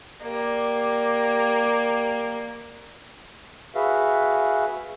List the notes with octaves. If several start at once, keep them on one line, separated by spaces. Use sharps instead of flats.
A#3 G4 D5
F#4 G#4 B4 E5 F5